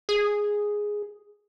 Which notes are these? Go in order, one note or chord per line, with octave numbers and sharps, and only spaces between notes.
G#4